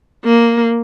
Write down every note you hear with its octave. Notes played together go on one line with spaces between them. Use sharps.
A#3